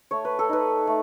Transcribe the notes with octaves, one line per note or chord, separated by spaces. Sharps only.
A3 C#5
B4
A4
D#4 B4
A3